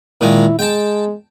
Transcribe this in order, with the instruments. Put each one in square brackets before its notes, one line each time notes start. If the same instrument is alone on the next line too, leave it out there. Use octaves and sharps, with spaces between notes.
[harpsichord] A#2 D#3 G#3 [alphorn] E4
[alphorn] G#3 [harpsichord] G5 A5